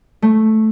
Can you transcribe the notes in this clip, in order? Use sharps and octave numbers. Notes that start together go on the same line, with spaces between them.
A3